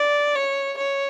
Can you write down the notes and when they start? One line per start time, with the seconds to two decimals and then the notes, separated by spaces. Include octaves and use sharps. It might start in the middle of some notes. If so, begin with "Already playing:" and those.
Already playing: D5
0.35 C#5
0.78 C#5